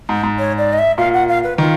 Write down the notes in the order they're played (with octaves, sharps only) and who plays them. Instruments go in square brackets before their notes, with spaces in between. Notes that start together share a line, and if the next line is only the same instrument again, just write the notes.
[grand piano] G#2
G#2
[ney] C#5
D5
D#5
E5
[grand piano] A#2 [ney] F5
[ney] F#5
F5
B4
[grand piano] D#3 [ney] F4